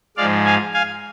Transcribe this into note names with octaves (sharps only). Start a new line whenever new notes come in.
G#2 F3 G#3 D5 F5
F5 G#5
F5 G#5